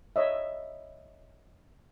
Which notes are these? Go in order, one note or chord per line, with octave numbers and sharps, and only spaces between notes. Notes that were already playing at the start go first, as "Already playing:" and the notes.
C#5 D#5 E5